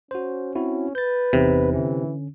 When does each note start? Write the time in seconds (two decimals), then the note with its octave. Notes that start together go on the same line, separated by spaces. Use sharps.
0.11 C#4 F#4 C5
0.55 C4 E4 F#4
0.95 B4 G6 A6
1.33 G1 E2 C3 D#4
1.73 D3 E3 C#4